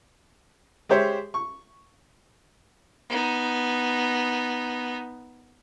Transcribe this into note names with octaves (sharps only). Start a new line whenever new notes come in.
G#3 G4 C5 C#5 E5
C#6
B3 D#4